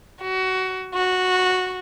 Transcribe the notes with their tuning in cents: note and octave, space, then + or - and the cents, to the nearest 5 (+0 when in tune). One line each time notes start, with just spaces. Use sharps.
F#4 +20
F#4 -10